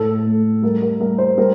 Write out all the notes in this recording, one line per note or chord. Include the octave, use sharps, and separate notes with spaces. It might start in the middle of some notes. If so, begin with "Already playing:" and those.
Already playing: A2 A4
A3
G3 A#4
A#4
G3 A#4
C5
G3 A#4